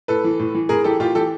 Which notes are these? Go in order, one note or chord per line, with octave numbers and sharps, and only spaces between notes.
A2 A4 B4
E3
A2
E3
A2 G#4 A#4
E3 G4 A4
A2 F4 G4
E3 G4 A4